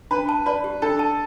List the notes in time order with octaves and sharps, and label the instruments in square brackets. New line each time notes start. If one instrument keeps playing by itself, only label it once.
[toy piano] D4 [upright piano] B4
[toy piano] A5
[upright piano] B4 [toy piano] D5
[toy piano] G4
[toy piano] D4 [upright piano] A4
[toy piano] A5